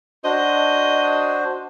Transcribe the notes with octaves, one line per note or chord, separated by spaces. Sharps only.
D4 F#4 C5 D#5